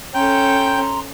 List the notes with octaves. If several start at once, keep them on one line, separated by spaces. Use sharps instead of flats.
C#4 A4 G5 A#5 C6 G6